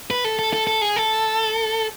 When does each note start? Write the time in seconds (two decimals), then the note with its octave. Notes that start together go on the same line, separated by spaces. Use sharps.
0.11 B4
0.24 A4
0.39 A4
0.53 A4
0.67 A4
0.82 G#4
0.96 A4